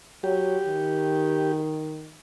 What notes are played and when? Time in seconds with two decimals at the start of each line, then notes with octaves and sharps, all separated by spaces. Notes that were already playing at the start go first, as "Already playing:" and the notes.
0.24 F#3 G4
0.67 D#3